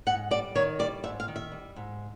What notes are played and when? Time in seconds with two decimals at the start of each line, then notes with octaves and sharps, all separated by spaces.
0.07 G#2 F#5
0.31 G3 D5
0.55 D#3 C#5
0.79 G3 D5
1.04 G#2 E5
1.20 F5
1.28 D#3
1.36 E5
1.52 G3
1.76 G#2